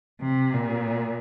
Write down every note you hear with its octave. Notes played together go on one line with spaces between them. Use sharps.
C3
A#2